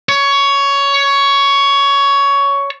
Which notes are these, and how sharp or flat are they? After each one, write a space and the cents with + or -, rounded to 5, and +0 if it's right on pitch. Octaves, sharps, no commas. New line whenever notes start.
C#5 +15